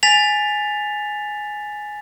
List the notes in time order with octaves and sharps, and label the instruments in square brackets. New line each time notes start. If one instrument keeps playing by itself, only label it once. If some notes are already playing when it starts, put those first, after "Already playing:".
[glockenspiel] G#5 A6 B6 F7